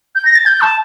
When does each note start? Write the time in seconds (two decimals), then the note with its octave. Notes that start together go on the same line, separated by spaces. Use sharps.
0.15 G6
0.25 A#6
0.35 A6
0.46 G6
0.61 A5